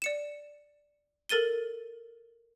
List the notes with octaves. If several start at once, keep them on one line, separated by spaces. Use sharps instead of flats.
D5 C#7 E7
A4 A#4 A6 D#7 G7